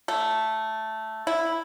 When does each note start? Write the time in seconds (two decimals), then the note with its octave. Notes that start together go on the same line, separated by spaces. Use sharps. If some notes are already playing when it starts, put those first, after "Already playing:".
0.08 A3
1.27 E4